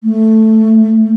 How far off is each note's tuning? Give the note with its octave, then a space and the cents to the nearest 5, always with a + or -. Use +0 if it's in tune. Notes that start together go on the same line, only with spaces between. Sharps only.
A3 +0